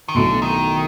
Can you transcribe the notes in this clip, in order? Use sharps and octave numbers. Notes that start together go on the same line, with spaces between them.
D#3
B1 A2 D3 F#3
D#3